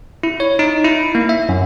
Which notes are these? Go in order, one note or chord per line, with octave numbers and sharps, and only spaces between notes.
E4
C#5
D#4
E4
A#3
E5
F#2